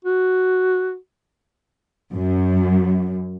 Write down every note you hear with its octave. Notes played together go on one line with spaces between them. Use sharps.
F#4
F#2